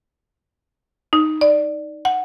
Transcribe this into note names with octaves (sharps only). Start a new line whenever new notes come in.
D#4
D5
F#5